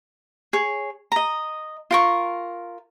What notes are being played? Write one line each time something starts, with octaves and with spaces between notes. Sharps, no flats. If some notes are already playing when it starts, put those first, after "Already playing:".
G#4 C#5
D#5 A#5
F4 A#4 C#6